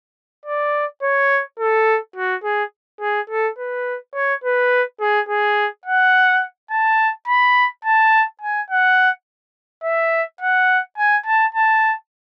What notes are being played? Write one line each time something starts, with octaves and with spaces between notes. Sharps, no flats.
D5
C#5
A4
F#4
G#4
G#4
A4
B4
C#5
B4
G#4
G#4
F#5
A5
B5
A5
G#5
F#5
E5
F#5
G#5
A5
A5